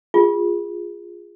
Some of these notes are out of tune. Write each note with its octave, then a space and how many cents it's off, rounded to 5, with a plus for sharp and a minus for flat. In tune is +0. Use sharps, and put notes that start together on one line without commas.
F4 +0 G#4 -20